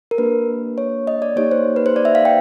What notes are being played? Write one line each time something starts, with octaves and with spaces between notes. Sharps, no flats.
A#4
A#3 D4 G4 B4
C#5
D#5
D5
A#3 D#4 G4 C#5
C5
B4
C5
D5
E5
F5
G5